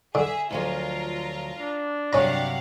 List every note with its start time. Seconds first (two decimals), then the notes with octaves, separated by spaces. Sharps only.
0.15 D3 G#4 E5
0.51 D2 F3 F#3 F4 A#4
1.60 D4
2.13 G2 C3 F#3 C#4 G4 F5 F#5 A#5